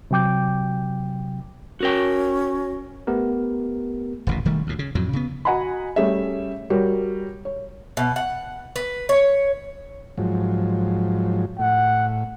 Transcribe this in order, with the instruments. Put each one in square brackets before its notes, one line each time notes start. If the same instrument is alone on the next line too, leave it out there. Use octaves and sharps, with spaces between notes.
[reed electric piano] C3 F#3 G5 D6 G6
[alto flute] C#4 [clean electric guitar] F#4 A#4 G5
[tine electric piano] A3 B3 G4 A#4
[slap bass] D#1 A1 B2
E1 D#3 G3 A3
D2 A2
C#3
F2 A2 F#3
C#3 B3
[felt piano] F#4 D#5 F#5 G#5 A#5 B5
G3 A3 C#4 G#4 E5
G3 F#4 A#4 C#5
C#5
[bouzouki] B2
F#5
B4
C#5
[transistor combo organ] G#2 F3 F#3
[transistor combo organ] A2 [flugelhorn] F#5